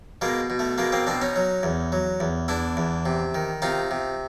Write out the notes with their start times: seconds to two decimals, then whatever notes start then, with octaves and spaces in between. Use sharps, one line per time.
0.21 B2 G#3 A#3
0.50 B2
0.59 A3
0.78 B2 G#3 A#3
0.92 A#3 C4
1.07 B2 C4 D4
1.22 C#4 D#4
1.36 F#3
1.63 E2
1.92 F#3
2.20 E2
2.48 E2 D4 E4
2.77 E2
3.06 C3
3.35 D#3
3.62 C3 D#4 F4
3.91 C3